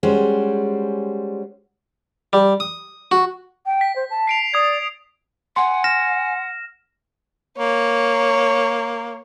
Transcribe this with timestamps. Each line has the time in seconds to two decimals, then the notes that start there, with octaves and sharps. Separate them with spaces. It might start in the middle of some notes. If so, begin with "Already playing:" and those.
0.03 G3 G#3 C#4 F#4 C5
2.33 G3
2.60 D#6
3.11 F#4
3.66 G5
3.81 B6
3.96 C5
4.10 A5
4.27 C7 D7 F7
4.54 D5 D#6 G#6
5.56 F#5 G#5 C6
5.84 F6 A#6 E7
7.58 A#3 C#5